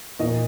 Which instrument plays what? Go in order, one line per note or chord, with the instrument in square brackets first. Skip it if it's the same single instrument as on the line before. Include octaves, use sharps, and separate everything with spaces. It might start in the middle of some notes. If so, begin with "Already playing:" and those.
[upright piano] A#2 D#5